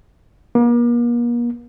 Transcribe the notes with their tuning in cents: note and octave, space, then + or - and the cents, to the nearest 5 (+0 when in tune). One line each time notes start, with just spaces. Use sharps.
A#3 +40